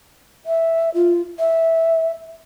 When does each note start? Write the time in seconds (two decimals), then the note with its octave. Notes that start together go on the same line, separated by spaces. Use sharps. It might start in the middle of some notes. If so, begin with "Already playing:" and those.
0.46 E5
0.94 F4
1.39 E5